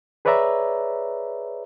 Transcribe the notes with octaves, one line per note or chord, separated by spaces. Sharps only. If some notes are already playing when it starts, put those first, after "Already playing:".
G#4 B4 C#5 D5 E5 A#5